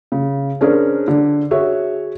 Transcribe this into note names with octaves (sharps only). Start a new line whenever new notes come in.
C#3
C#4 D4 G#4 A#4 C5
D3
F#4 G#4 C#5 E5